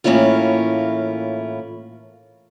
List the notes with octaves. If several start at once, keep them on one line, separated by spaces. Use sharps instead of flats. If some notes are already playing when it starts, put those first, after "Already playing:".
A2 E3 A#3 C#4 E4 F4